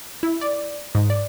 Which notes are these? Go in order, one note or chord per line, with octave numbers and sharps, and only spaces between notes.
E4
D5
G#2
D5